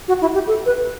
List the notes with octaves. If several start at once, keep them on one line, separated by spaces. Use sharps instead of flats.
F#4
E4
G4
A4
B4